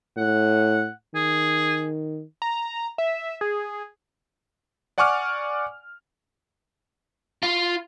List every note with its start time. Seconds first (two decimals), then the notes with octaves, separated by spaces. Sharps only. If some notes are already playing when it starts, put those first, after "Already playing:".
0.17 A2 F#5
1.15 D#3 G#4
2.42 A#5
2.98 E5
3.41 G#4
4.98 D5 F#5 G#5 C#6 D6 F6
7.43 F4